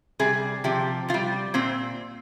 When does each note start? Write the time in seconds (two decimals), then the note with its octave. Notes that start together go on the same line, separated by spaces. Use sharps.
0.19 C3 G3 G#4
0.64 C3 F3 G4
1.09 C3 F4
1.14 G3
1.54 A#2 C4